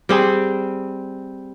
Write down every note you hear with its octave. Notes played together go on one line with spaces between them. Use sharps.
G3 C4 G#4